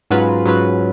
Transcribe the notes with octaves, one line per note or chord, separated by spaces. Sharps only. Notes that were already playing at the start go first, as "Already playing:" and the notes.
G#2 F#3 C#4 F4 B4
G#2 F#3 C#4 F4 B4